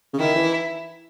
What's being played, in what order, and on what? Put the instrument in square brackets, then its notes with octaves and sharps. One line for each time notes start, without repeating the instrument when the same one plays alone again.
[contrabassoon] C#3
[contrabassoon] D#3 [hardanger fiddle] E4
[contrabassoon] E3